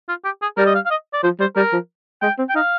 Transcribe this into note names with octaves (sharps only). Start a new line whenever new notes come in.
F4
G4
G#4
G3 A#4
D#5
F5
F5
D#5
D5
F3 C5
G3 C5
G3 A#4
F3
G#3 G5
C4
G5
D#4 F5